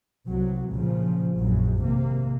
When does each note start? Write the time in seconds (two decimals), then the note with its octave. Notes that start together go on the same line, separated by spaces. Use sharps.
0.25 C2 F#3
0.70 A#2 C#3 F3
1.36 A#1 F#2 F#3
1.82 G#1 C3 A#3